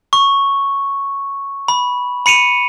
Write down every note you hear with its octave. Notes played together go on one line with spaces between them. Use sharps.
C#6
B5
B5 C#7 D#7 F7